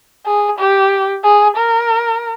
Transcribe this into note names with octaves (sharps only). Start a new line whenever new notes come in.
G#4
G4
G#4
A#4